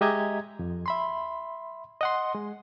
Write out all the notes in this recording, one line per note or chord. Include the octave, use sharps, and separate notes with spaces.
G#3 G4 D#5 E5 A#5 G#6
F2
E5 B5 C6
D#5 F#5 C6
G#3